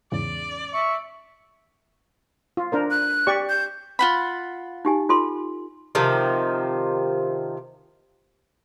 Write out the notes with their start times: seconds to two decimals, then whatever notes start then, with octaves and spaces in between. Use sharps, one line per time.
0.12 E2 G#2 C#3 D5
0.74 E5 C#6
2.57 F4
2.72 D4 A#4 C5
2.91 F#6
3.27 G4 D5 C#6
3.49 G6
3.99 F4 F#5 B5
4.85 D#4 G4 G#5
5.09 F4 A4 C6
5.95 C3 D#3 F3